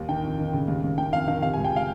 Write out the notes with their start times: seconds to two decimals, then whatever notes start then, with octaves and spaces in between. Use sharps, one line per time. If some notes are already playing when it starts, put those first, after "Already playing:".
Already playing: D#2
0.09 D#3 G5
0.23 F2
0.38 D#3
0.53 C#3
0.68 D#2
0.84 D#2
0.97 D#3 G5
1.12 F2 F5
1.27 D#3 F5
1.42 C3 F5
1.53 G#5
1.57 C#2
1.64 G5
1.76 F5